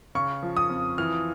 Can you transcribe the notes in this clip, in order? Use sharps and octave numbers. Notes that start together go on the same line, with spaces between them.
C#3 C#6
F3
D#6
F2
E3 F6